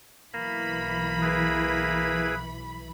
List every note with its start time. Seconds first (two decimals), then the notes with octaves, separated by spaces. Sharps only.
0.34 B1 E3 A#3 B5
1.21 E4 G#4 B4